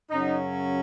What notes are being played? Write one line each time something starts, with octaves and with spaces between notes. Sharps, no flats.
F#2 C#3 F#3 C#4 D#4